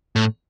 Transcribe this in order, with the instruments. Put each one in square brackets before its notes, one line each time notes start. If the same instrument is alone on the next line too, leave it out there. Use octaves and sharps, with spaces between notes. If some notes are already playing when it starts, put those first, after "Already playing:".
[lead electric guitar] A2